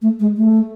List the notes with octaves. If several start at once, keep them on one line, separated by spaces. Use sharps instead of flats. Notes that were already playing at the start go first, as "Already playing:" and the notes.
A3
G#3
A3